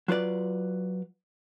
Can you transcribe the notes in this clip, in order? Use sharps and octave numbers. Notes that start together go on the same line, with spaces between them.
F#3 F4 B4 D5